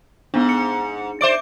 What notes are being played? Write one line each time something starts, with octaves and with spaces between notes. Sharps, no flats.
G#2 B3 D4
C#7
C5 D5 E5 D6 D7